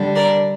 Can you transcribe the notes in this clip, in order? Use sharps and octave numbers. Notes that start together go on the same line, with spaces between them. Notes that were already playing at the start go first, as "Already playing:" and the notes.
Already playing: D3 G3 D4
A#4 D5